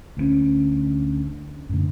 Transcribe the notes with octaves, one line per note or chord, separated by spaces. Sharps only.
D2 G3 C#4
F#2 A2 D3